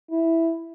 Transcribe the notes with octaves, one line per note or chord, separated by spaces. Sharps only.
E4